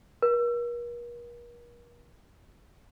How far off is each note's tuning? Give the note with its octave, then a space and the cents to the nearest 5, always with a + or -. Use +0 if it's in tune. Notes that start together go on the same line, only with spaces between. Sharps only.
A#4 +40